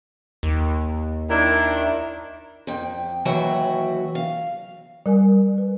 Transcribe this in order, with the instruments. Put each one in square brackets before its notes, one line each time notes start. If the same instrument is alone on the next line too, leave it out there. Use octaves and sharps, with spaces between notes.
[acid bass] D#2
[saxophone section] D#3 D4 E4
[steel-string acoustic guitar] F2 G5
D#2 E3 F#3 F#4 E5 G5
F5
[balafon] G3 A#4 G#5
B4